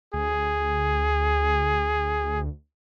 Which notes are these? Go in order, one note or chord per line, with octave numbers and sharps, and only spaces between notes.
D2 G#4